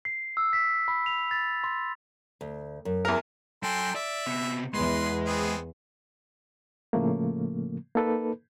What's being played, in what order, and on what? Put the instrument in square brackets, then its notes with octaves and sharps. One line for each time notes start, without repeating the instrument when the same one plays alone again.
[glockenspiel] C7
E6
B6
B5
F7
A6
C6
[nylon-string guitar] D2
F#2
[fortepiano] E2 A#4
[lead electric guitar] F#3 G#5 [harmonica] A4 G5 C6
[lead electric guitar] D5 [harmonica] E5
[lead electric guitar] C3 B3
[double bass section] E2 [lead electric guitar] G#3 [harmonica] B4 C6
[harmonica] B3 C4 G#4
[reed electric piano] A2 C#3 F3 A3 A#3
A#3 D#4 A4 B4